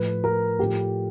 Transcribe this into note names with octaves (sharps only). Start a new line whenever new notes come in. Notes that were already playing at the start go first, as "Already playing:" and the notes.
Already playing: A2 F3 B4
A#4
A2 F3 G4